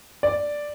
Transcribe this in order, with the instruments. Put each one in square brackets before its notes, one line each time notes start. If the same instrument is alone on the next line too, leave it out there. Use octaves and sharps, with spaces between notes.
[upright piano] D5